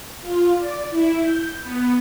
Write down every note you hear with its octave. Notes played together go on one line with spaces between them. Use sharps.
F4
D5
E4
G6
B3